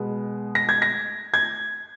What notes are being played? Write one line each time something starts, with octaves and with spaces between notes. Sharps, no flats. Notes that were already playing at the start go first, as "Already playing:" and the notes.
Already playing: B2 G#3 B3
A#6
G#6
A#6
G#6